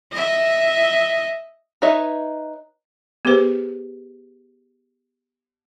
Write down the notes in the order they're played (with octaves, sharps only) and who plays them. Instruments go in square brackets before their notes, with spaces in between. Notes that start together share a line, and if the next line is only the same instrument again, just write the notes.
[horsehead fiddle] D#5 E5
[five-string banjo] D#4 B4 C#5 D#5 E5
[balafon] B3 G4 G#4 B4 C5